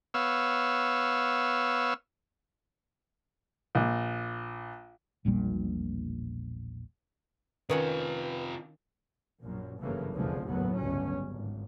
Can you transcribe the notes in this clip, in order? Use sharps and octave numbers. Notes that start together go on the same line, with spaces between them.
B3 C#5 F5 E6
A#1
E1 A#1 A#2 G3
C3 D#3 C#4 F4 B4 F#5
A#1 F#2 A#2
F#1 G2 C#3 E3 A3 A#3
F1 A#1 E2 D3 F3 G#3
F#1 D#2 A2 F#3 B3
G1 C#2 C#4
G#1